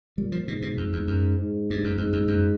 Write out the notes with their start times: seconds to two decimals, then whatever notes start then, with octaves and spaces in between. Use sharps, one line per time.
0.17 A#2 G3
0.32 F3
0.47 G#2 B2
0.62 B2
0.77 F2
0.93 E2
1.07 F#2
1.37 G#2
1.70 G2
1.84 F#2
1.97 F2 G#2
2.13 F2
2.28 F#2